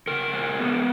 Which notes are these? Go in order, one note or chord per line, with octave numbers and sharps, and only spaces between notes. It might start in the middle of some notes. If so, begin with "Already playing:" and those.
C#3 A#4
G#3
B3